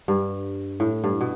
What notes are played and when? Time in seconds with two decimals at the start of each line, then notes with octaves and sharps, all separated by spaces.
0.08 G2
0.80 A2
1.04 G2
1.21 B2